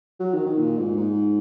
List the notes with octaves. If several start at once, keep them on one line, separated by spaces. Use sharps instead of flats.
F#3
D#3
D#3
A#2
G#2
G#2